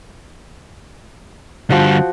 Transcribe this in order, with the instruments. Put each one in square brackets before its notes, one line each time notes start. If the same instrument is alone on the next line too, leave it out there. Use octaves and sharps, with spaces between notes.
[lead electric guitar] D3 G3 [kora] F3 F#4 F#5